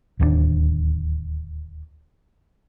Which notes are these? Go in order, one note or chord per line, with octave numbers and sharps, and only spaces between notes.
D1 D#2 C4 D4